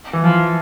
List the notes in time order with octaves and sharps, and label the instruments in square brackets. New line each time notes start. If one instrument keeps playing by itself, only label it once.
[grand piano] E3
[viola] F3